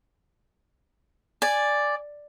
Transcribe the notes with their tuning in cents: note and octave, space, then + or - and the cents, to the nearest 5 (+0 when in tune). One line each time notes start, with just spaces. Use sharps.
D5 +0 G#5 -5